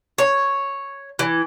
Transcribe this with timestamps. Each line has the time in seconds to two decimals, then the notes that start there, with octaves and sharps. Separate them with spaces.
0.18 C#5
1.19 E3